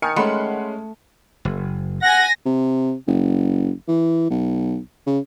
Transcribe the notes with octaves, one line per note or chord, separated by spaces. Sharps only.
D#3 G#5 F6 C#7
G#3 A3 C#4 F#5 B5 C6
F#1
F#5 G#5 A#6
C3
F#1
E3
B1
C#3